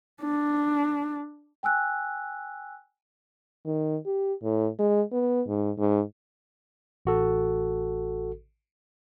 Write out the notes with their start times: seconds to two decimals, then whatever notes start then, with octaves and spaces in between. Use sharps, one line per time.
0.22 D4
1.63 G5 G#5 E6 F#6
3.65 D#3
4.06 G4
4.43 A2
4.79 G#3
5.12 B3
5.47 G#2
5.78 G#2
7.05 A1 F#4 A4